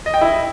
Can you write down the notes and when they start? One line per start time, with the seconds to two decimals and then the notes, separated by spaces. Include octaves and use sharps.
0.06 D#5
0.14 G5
0.21 E4